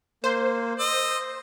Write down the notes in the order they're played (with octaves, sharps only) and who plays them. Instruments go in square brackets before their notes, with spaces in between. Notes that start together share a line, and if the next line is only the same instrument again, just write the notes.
[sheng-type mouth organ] A#3 [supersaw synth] C5
[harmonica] D#5 [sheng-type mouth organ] E6